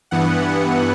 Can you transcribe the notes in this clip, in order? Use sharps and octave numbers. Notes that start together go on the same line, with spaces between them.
G2 E3 B3 F#5